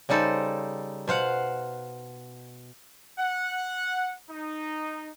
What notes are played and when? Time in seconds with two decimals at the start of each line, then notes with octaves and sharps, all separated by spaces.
0.09 C#3 G3 D#4 A4 C5
1.08 B2 C5 F5 F#5
3.18 F#5
4.29 D#4